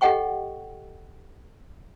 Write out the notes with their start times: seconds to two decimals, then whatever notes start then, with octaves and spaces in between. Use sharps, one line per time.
0.01 G4 A4 D#5 F#5 G5 C#6